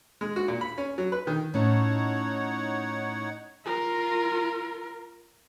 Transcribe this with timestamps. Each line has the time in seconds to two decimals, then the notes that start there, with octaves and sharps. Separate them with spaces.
0.21 G#3
0.36 F#4
0.48 A#2
0.61 B5
0.78 C#4
0.98 F#3
1.12 B4
1.27 D#3
1.54 A2 C#4 D#4 C#5 F#5
3.65 F4 A#4